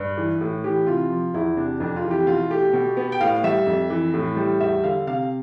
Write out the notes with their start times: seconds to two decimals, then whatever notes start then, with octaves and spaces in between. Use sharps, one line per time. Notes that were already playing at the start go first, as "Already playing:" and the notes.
Already playing: G2 B4
0.17 E3
0.41 A2
0.64 E3 G4
0.87 C3 F4
1.10 F3
1.34 E2 E4
1.57 C3 D4
1.80 F2 D4
1.96 F4
2.04 E3
2.11 G4
2.27 B2 F4
2.50 A3 G4
2.73 B2
2.97 B3
3.12 G5
3.20 A2 F5
3.44 G3 E5
3.66 F2
3.90 E3
4.14 A2
4.37 G3
4.60 E2 E5
4.83 D3 F5
5.07 C3 F5